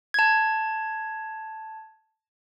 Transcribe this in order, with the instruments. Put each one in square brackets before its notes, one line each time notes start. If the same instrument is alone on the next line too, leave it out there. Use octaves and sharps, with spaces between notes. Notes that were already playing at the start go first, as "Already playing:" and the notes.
[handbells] A5 G#6